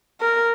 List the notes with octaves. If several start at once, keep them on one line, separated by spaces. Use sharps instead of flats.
A#4